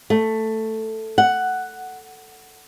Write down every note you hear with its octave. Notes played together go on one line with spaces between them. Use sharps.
A3
F#5